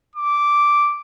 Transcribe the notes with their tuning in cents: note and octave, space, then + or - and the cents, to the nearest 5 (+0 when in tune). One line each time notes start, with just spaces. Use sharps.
D6 -5